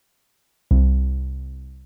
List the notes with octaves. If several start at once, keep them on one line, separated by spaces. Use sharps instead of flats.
C2